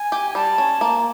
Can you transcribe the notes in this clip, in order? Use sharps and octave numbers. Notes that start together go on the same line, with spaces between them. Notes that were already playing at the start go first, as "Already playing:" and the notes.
Already playing: G#5
G4
G#5
G3 A5
C#4
A#3